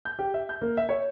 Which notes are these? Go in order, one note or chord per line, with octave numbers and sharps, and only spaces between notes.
G6
G4
E5
G6
A#3
E5
C#5